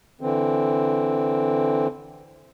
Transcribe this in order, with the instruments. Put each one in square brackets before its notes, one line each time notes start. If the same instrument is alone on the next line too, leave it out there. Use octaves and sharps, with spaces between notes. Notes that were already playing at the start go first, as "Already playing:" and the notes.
[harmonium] D3 E3 C4